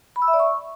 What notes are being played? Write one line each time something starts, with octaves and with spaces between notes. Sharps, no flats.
B5
E6
E5
D5
C#6